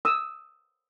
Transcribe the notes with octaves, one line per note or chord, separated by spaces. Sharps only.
D#6 E6